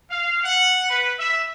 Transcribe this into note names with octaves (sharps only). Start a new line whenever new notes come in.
F5
F#5
B4
E5